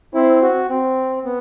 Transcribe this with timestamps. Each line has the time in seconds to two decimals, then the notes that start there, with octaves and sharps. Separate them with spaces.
0.14 C4 E4
0.42 F#4
0.69 C4
1.25 B3